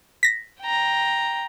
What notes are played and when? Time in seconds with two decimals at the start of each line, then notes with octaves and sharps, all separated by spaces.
0.23 A#6 B6
0.61 G5 A#5